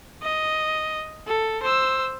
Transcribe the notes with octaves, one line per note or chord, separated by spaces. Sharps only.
D#5
A4
C5 E6